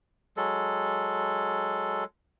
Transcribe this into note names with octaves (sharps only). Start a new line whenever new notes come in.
F#3 G#3 A4